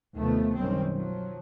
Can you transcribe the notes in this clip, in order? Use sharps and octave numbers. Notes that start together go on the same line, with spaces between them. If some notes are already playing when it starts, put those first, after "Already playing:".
D#2 C3 F3 A3 B3
F#1 B1 D#3 G3 C4 C#4
F3 F#3